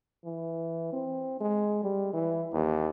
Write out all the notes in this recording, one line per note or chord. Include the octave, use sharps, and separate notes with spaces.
E3
C4
G#3
G3
E3
D#2